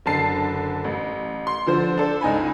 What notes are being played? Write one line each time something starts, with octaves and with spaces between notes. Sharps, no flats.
F#1 D3 A5 C7
A1
C6
D3 F3 C5
D4 A4 C5
C#2 D#4 G#5 B5